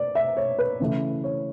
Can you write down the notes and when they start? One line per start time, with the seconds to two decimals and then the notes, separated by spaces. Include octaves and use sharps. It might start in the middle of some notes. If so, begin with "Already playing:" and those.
Already playing: D5
0.15 E5
0.37 C#5
0.58 B4
0.80 C#3 E3 A3 E4
1.24 C#5